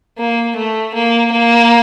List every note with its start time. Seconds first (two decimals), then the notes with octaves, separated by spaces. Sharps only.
0.18 A#3
0.56 A3
0.94 A#3
1.32 A#3